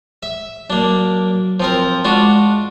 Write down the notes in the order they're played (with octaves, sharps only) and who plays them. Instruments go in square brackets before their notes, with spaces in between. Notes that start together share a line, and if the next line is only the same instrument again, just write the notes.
[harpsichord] E5
[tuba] F#3 [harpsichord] A#3 D4
[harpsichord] F3 C4 A#4
[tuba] G#3 [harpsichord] D4 F4 F#4